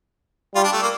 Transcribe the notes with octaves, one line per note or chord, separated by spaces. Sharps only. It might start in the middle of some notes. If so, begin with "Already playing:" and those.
G3 F4
D4
A3
A#3